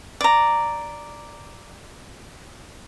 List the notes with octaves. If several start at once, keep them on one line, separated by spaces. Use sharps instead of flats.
D5 A#5